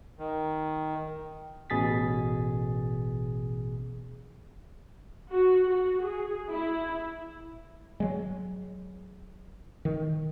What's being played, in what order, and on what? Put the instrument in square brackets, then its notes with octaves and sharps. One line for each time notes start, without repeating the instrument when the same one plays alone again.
[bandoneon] D#3
[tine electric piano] A1 B2 G#4 A6 B6
[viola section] F#4
F#4
G#4
E4
[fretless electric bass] F#3 G#3
D#3